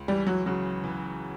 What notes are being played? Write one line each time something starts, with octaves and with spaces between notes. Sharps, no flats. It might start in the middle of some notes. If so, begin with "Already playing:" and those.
Already playing: C#2
E3 G3
F#3
C#3 F#3
E3